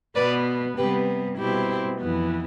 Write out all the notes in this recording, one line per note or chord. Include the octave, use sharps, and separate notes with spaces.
B2 B3 B4 D5
C3 G3 B3 G4 B4
B2 G3 C4 E4 G4
F2 E3 B3